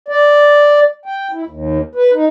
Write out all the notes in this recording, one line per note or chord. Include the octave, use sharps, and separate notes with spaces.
D5
G5
E4
D#2
B4
D#4